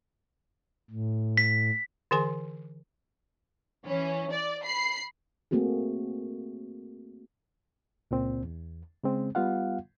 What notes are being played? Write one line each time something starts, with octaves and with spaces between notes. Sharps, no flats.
A2
B6
D3 E3 G#4 G#5 C6
E3 C#4
D5
B5 C7
A3 A#3 C4 F#4 G#4
C#2 A#2 C4
E2
C#3 G#3 C4
G3 B3 F4 F5 F#5